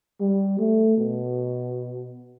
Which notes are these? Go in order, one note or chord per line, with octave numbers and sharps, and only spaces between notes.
G3
A3
B2